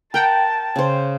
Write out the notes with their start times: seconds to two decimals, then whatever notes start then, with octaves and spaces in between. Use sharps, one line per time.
0.14 A#4 F#5 G5 A5
0.76 C#3 C5